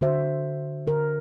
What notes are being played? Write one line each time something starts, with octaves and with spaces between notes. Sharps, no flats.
D3 F#4 C5 E5
D3 A#4